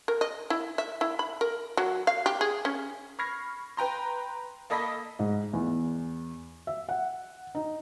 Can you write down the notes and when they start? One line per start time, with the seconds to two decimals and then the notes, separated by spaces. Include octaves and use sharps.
0.08 A#4
0.21 D#5
0.50 E4
0.78 E5
1.01 E4
1.19 B5
1.41 A#4
1.77 F#3
2.07 F5
2.26 G4
2.41 G#4
2.65 C#4
3.19 B5 C#6 F6 G#6 A#6 C7
3.77 B4 G5 A#5 C6
4.70 A#3 A4 D#5 B5 A#6 B6
5.19 G#2
5.53 E2
6.67 E5
6.89 F#5
7.55 D#4